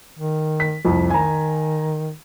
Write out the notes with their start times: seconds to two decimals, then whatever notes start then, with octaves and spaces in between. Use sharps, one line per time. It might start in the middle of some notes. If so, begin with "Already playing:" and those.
0.19 D#3
0.60 B6
0.85 C2 F2
1.10 D#3 G#5 A#5